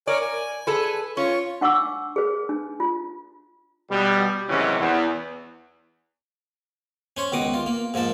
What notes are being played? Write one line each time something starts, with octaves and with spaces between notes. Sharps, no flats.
A#4 C#5 D5 G#5
G#5
G#4 A4 B4
C#4 F4 C#5 C#6
D4 F#5 C#6 D6 E6
G#4 B4
D4
F4
B2 G3
C3 D#3 E3 F#3 G#3 C#4
E2
C#4 C5 C#5
C#2 B2 D#3 D6 D#6
F4
A#3
G#2 F3 A#3 A5